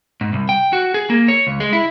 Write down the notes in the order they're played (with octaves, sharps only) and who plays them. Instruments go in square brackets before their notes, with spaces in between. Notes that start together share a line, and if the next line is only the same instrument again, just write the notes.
[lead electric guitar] G#2
C2
G5
F#4
G#4
A#3
C#5
C#2
G#3
E4